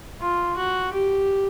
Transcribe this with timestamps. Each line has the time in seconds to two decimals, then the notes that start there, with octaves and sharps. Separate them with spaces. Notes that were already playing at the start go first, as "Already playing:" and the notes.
0.21 F4
0.56 F#4
0.93 G4